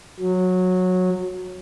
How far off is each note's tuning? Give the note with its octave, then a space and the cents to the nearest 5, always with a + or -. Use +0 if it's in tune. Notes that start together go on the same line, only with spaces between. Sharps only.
F#3 -15